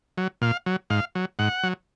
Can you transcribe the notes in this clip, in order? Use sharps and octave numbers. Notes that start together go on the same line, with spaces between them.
F#3
A#2 F5
F#3
G#2 F5
F#3
G#2 F#5
F#3